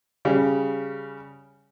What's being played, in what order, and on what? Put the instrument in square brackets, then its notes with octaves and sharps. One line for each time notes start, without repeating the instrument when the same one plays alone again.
[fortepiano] C#3 G3